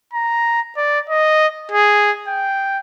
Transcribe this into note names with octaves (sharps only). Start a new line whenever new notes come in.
A#5
D5
D#5
G#4
G5